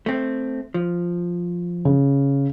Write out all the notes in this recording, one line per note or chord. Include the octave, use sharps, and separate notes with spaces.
A3 C4
F3
C#3